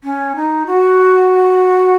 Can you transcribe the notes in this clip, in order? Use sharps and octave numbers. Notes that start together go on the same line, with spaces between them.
C#4
D#4
F#4